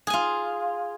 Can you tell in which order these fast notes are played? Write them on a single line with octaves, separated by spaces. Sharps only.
G#4 G#5 F4